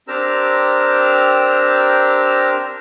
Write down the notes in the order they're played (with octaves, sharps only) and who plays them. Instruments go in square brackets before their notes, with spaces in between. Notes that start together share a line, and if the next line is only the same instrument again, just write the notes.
[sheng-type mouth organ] C4 D4 G4 A#4 A#5 E6